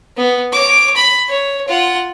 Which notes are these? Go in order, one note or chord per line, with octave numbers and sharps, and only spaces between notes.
B3
C#5 D6
B5
C#5
F4 F#5